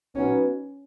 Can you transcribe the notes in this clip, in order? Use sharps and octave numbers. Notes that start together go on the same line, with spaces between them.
F#3 B3 C#4 D#4 F#4 B4